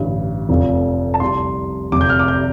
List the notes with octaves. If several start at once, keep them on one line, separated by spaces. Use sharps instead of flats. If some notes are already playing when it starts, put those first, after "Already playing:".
Already playing: A1 G2 D3
F1 F2 F3
A5
C2 C3 G3 C6
F1 F2 C3 D6
G6
F6
D6
G6